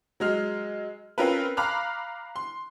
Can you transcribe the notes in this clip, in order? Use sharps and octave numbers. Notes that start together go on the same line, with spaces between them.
F#3 G#3 F6
C4 C#4 F4 A#4 B4
F5 A#5 B5 D6 F6 F#6
C6